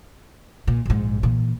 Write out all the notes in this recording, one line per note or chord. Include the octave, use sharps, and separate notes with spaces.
A#2
A#1 G#2
A#2 E3